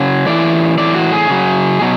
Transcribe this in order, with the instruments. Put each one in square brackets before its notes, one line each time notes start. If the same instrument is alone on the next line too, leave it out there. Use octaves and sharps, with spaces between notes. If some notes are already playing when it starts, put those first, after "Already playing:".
Already playing: [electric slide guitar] C#3 F#3
A2 E3 D5
A2 E3 D5
F#4
G#4
C#3 F#3
B2 F#3